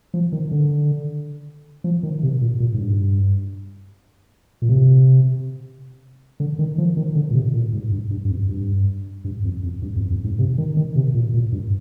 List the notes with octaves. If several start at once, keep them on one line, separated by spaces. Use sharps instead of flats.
F3
D#3
D3
F3
D#3
C3
A#2
A#2
G#2
G2
A#2
C3
D3
D#3
F3
D#3
D3
A#2
C3
A#2
G#2
G2
G2
G2
F2
G2
G2
F2
F2
G2
F2
F2
G#2
C3
D#3
D#3
C3
A#2
A#2
G2